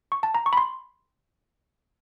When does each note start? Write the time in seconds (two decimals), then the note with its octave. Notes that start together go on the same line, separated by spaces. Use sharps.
0.12 C#6
0.23 A5
0.35 A#5
0.46 C#6
0.53 B5
0.57 C6